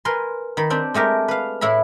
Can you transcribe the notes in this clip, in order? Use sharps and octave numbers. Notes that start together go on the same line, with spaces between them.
A#4 B4 G#5 C6
D#3 B5
C4 D4 G4
G#3 A3 G4 A#4
B4 F5
A2 E4 E5 B5